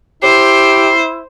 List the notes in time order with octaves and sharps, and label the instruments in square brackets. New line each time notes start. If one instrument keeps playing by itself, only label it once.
[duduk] E4 [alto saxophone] G4 [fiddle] C5 [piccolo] C7